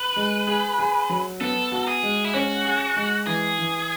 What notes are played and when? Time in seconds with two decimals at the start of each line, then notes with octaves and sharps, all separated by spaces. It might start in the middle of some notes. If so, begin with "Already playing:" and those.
Already playing: B4
0.16 G#3
0.47 G#4
0.79 G#4
1.09 F#3
1.41 B3 A4
1.72 F#4
1.88 G#4
2.03 G#3
2.25 E4
2.34 C#4 F#4
2.65 G#4
2.96 G#3
3.27 E3 G#4
3.59 E3